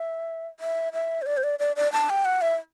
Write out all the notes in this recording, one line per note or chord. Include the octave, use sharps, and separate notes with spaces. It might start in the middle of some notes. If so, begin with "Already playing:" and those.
Already playing: E5
E5
E5
C5
D5
C5
D5
D5
D5
A5
G5
F#5
E5